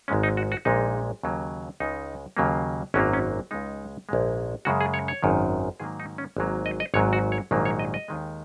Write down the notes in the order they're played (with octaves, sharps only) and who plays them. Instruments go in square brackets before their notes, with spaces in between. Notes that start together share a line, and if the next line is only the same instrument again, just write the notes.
[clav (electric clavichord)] G#1 G#2 G#3 C#4
D#4
F#4
F#4
A#1 A#2 G#3 D#4
D#2 C#3 F#3 A#3
C#2 C#3 G#3 D#4
D#2 C#3 F#3 A#3
G#1 F#2 F#3 A#3 C#4
C#4
C#2 C#3 G#3 D#4
A#1 G#2 G#3
F#2 C#3 G#3 F#4
G#4
C#5
C#5
G#1 F#2 D#3
G#2 D#3 F#3 A#3 G#4
D#4
C#4
G#1 G#2 F#3 A#3
D#5
D#5
G#1 G#2 F#3 C#5
F#4
C#5
A#1 G#2 D#3 F#3 A#3
C#5
D#5
D#5
D#2 D#3 G#3